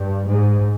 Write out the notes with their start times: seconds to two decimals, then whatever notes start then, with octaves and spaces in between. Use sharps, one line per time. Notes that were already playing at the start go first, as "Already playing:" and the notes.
Already playing: G2
0.27 G#2